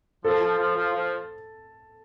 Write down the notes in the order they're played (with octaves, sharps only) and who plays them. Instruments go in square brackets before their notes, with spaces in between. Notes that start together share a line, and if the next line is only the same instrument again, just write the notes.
[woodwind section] F3 [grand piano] A4
[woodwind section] F3
F3
F3
F3